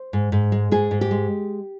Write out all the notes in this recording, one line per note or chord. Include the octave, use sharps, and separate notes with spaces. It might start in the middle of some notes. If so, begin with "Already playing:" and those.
Already playing: C5
G#2
G#2
G#3
G#2 G#4
G#2
G4
G#3